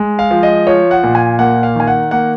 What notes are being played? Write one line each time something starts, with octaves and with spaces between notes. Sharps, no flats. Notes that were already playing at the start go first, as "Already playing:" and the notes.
Already playing: G#3
F5
F3
D#5
F3 C#5
F#5
A#2
G#5
A#3 F#5
F5
D#3 G#5
F#5
A#3 F#5